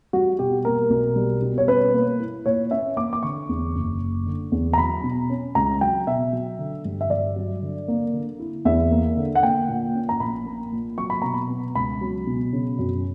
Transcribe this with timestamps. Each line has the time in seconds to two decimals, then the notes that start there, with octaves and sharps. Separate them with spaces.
0.13 G3 F#4
0.39 B2 G4
0.65 A#3 A#4
0.90 B1
1.16 G3
1.42 B2
1.58 C#5
1.68 C#4 B4
1.94 A#3
2.20 E4
2.46 A#2 C#5
2.71 C#4 E5
2.97 A#3 D6
3.13 D6
3.23 D3 C#6
3.49 E2
3.75 F#1
4.01 F#1
4.26 D3
4.52 E2
4.73 A#5
4.78 F#3 B5
5.04 B2
5.30 C#4
5.55 C#2 A#5
5.81 F#3 G5
6.07 B2 E5
6.33 F#3
6.59 D3
6.85 G2
7.01 E5
7.10 G2 D5
7.36 F#3
7.62 D3
7.88 A#3
8.14 D3
8.40 E4
8.65 E2 E5
8.91 A#3
9.17 D3
9.35 F#5
9.43 A#3 G5
9.69 A#2
9.95 C#4
10.09 A#5
10.20 A#1 B5
10.46 A#3
10.72 A#2
10.98 F#3 C#6
11.10 B5
11.22 B2 A#5
11.34 B5
11.49 B3
11.75 C#2 B5
12.01 F#3
12.27 B2
12.53 C#3
12.79 F#2